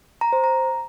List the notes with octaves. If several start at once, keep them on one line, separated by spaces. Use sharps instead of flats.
A#5
C5
A#5